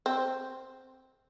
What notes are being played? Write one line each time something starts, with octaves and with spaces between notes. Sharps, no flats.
C4